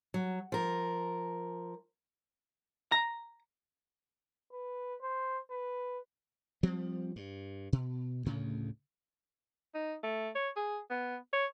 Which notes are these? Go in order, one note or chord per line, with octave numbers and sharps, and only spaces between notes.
F#3
F3 A#4
A#5
B4
C5
B4
F3 G3 C4
G2
B2
D2 A2 C#3
D#4
A3
C#5
G#4
B3
C#5